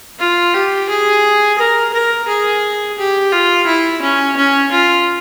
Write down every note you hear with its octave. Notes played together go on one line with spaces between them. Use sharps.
F4
G4
G#4
A#4
A#4
G#4
G4
F4
E4
C#4
C#4
F4